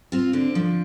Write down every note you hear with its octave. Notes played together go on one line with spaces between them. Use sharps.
C4 F4
D3 D4
F3